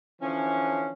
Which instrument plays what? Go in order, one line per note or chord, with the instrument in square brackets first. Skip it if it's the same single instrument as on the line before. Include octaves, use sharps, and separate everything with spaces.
[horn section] D3 E3 F3 C#4